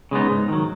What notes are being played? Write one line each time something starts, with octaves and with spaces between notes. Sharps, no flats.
C#3 G#3 B3 D#4
G#2
D#3 F#3